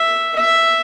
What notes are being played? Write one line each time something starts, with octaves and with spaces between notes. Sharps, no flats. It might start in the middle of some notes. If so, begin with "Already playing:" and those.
Already playing: E5
E5